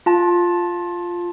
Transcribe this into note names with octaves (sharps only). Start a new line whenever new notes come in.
F4 A5